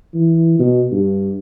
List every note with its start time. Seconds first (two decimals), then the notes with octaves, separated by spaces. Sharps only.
0.14 E3
0.59 B2
0.92 G2